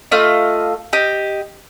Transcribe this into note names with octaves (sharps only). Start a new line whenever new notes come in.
A3 F4 D#5
G4 D#5